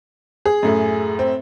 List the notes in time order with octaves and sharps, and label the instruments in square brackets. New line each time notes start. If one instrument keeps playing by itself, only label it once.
[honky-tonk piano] G#4
[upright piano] F#2 A2
[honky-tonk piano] C4